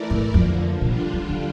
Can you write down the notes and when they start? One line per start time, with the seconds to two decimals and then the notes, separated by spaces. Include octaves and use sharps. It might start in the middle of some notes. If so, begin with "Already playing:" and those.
Already playing: E3 A3 E4 A#4 D5
0.11 A2
0.34 F2 D3 F3 A#3
0.81 A#2 D3 G3 D4 F4
1.13 E3
1.29 F3